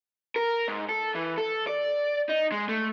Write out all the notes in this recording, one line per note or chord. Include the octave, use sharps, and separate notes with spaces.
A#4
G#2
A4
E3
A4
D5
D#4
G#3
A3